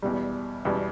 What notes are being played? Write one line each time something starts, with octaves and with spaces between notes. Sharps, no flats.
E2 B2 G3
E2 B2 G3